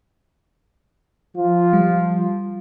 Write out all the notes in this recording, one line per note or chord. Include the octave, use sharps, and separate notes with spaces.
F3 F4
G3